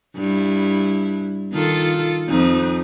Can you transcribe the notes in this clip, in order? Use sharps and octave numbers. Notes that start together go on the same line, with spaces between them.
G2 E4
D#3 F4 A4
F2 C4 D#4